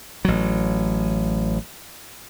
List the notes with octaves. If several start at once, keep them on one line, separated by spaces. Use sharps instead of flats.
A1 F#3